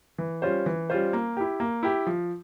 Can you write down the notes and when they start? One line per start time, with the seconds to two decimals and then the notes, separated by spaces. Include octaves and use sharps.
0.18 E3
0.42 G3 C#4 F4 C5
0.66 E3
0.90 G3 C#4 F4 C5
1.13 A#3
1.37 E4 G4
1.60 A#3
1.83 E4 G4
2.07 F3